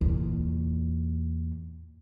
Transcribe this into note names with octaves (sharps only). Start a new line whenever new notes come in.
E2 A#2